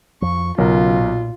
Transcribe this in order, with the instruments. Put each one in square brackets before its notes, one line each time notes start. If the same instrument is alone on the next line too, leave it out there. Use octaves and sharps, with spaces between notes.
[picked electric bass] F2 F3 [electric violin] C#6
[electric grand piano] B1 A#4 [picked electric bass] C#3 F#3 C#4 [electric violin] F4
[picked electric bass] A#2